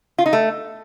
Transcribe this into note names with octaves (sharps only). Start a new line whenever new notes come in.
F4
D#4
A3